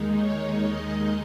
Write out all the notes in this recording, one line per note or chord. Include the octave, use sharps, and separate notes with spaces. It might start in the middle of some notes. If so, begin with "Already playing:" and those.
Already playing: D#2 D#3 G#3 D#4
C#5
D#5